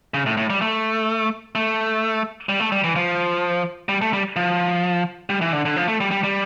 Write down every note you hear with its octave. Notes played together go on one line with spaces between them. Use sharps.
C#3
A2
A2
G3
A3
A3
G3
A3
G3
E3
F3
G3
A3
G3
F3
G3
E3
D3
D3
F3
A3
G3
G3
G3